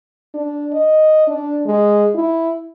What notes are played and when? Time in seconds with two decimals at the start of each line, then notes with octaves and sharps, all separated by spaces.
0.34 D4
0.73 D#5
1.27 D4
1.66 G#3
2.15 E4